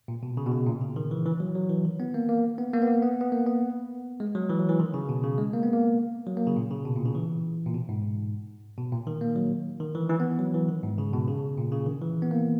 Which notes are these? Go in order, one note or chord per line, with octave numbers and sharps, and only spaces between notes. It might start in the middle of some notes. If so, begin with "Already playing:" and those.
A#2
B2
C#3
B2
C#3
A#2
C#3
D#3
E3
E3
F#3
F#3
E3
D#3
B3
A#3
A#3
B3
A#3
B3
A#3
B3
B3
A#3
B3
G#3
F#3
E3
F#3
E3
D#3
C#3
B2
C#3
G#3
A#3
B3
A#3
F#3
A#3
C#3
A#2
C#3
B2
A#2
C#3
E3
A#2
B2
G#2
B2
A#2
D#3
A#3
F#3
D#3
E3
E3
B3
F#3
E3
D#3
G#2
C#3
B2
C#3
A#2
C#3
D#3
E3
B3
A#3